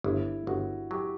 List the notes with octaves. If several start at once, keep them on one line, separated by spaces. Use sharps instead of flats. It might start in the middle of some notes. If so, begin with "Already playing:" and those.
G1 E4
G1 F#4
F#3 G4